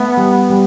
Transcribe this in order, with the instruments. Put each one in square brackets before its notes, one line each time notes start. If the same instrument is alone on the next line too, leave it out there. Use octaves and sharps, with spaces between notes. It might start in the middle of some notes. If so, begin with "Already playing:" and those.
Already playing: [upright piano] A3 [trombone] B3
[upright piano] G3
G3